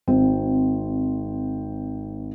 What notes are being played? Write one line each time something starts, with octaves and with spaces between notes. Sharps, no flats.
G#1 C4